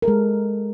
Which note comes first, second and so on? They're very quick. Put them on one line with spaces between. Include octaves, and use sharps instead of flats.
A#4 A4 G#3